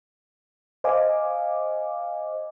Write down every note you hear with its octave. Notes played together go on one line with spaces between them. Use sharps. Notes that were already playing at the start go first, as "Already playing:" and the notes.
C5 D#5 F5 G#5 D6